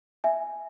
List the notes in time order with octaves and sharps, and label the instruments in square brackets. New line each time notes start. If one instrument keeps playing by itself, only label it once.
[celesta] E5 G#5